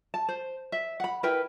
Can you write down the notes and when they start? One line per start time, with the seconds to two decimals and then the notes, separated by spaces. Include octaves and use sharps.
0.14 A5
0.29 C5
0.72 E5
1.00 F#5 B5
1.23 E4 A#4 B4 G5